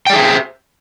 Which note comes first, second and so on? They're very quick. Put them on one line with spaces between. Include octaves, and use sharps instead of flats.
G5 D5 G#4 E5 C5